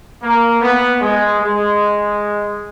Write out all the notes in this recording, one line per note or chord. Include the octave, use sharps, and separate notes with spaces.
A#3
B3
G#3
G#3